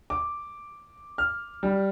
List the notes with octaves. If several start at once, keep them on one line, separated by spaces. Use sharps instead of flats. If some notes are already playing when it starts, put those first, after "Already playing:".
D6
F6
G3